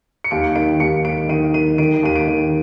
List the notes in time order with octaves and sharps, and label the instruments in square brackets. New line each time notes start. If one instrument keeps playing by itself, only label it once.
[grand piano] C#7
D#2 D7
D#3 D7
D#2 C#7
D#2 D7
D#3 D#7
D#3 D#7
D#3 D7
D#2 D#7
D7
D#3